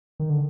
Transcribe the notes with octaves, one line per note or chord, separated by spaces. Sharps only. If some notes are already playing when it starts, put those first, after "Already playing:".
D#3
D3